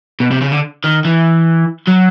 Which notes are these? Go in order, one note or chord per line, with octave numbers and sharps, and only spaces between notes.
B2
C3
C#3
D3
D#3
E3
F#3